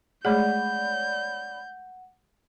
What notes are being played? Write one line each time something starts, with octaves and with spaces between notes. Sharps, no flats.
G#3 A3 G#4 C#5 D5 F#5 B5 G6